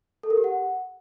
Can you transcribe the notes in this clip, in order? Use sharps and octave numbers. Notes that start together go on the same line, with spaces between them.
A4
A#4
G4
F#5